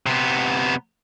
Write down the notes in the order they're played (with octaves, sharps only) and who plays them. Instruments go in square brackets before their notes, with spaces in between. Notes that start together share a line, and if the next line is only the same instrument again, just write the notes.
[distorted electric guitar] C3 B3